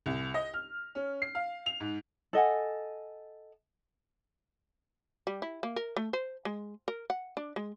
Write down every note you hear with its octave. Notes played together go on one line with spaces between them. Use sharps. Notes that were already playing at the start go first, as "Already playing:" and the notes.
C2
D#5
F6
C#4
C7
F5
F7
G#2
A4 D#5 F#5 G#5
G3
E4
A#3
A#4
A3
C5
G#3
A#4
F#5
D4
G#3